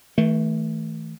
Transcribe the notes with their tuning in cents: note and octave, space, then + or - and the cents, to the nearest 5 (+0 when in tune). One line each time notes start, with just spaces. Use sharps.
E3 -40 A3 +0